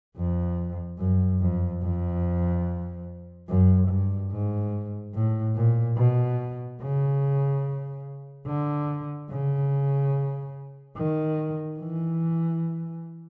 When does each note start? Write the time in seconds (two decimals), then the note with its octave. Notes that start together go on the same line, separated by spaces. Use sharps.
0.16 F2
0.98 F#2
1.41 F2
1.82 F2
3.49 F#2
3.89 G2
4.30 G#2
5.14 A2
5.55 A#2
5.97 B2
6.81 C#3
8.46 D3
9.30 C#3
10.96 D#3
11.79 E3